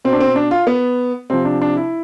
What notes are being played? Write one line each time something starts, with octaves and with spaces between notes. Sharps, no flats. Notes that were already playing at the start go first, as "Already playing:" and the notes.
B2 C4
D4
C4
D4
F4
B3
C3 F3 C4
D4
D4
E4